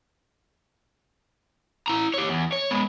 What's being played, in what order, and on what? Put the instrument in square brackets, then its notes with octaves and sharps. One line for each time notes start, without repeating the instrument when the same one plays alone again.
[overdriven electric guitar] E4 A#5
G4 C#5
E2
C#5
G#3 B3